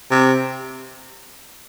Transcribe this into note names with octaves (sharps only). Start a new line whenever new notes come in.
C3